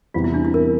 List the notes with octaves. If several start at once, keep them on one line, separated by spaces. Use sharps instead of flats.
E2 C3 E3 G3 F4
E4
D4
E4
A#4